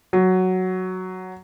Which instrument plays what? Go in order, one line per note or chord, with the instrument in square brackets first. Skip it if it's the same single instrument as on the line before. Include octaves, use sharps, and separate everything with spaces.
[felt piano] F#3